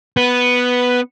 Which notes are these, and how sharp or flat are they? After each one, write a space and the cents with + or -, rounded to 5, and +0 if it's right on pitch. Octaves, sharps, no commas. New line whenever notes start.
B3 +0 B4 +0